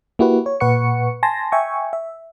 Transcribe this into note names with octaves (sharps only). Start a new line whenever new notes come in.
A#3 E4 F#4 G4 B4
C#5
A#2 B4 F#5 C#6 C#7
G#5 A5 C6 A#6
E5 G5 G#5 C#6
E5